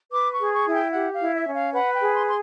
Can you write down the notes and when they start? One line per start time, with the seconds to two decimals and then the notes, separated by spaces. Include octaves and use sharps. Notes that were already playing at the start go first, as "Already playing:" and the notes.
0.12 B4 D6
0.32 C#6
0.39 G#4
0.53 C#6
0.66 E4 G#5
0.73 G5
0.92 G4 F#5
1.13 F5
1.20 E4
1.33 E5
1.47 C#4
1.53 F5
1.73 B4 F#5
1.94 G5
2.00 G#4
2.13 C6
2.27 C6